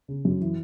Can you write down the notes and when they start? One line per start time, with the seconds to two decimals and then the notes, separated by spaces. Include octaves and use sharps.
0.08 C#3
0.25 F#2
0.41 E3